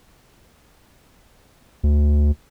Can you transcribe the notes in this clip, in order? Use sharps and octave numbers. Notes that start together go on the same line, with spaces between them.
D2